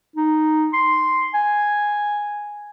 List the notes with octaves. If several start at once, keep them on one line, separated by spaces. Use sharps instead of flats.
D#4
C6
G#5